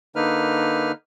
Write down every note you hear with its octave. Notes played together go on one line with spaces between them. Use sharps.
D3 A#3 D#4 B4 F6